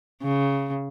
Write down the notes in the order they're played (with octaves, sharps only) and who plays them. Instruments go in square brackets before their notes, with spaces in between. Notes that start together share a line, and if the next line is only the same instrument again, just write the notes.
[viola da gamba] C#3